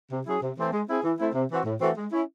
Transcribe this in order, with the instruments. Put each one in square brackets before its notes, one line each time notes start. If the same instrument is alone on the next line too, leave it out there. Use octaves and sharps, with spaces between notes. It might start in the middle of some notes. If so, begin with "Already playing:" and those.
[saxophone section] C3
F#3 C#4 E4 G#4
C3
E3 A3 C4
G#3
C4 E4 G#4
E3
A3 C4 E4
C3
E3 C4 F#4
A2
E3 A3 C4 F#4
G#3
C#4 E4